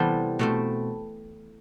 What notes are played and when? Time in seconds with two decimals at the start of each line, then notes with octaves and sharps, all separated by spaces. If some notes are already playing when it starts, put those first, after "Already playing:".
Already playing: C3 E3 G3 B3 E4 A4 C5
0.39 B2 A3 C4